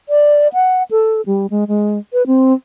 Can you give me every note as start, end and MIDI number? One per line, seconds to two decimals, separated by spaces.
0.09 0.48 74
0.53 0.83 78
0.91 1.21 69
1.26 1.47 55
1.50 1.68 56
1.68 1.98 56
2.13 2.26 71
2.27 2.53 60